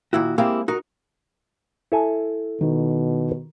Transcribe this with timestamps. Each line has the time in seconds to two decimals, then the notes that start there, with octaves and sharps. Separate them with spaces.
0.13 A#2 D#3 E4 F#4
0.38 G#3 A#3 C4 E4 G4 F5
0.68 D#4 F#4 A#4
1.92 E4 A4 G#5
2.61 B2 D#3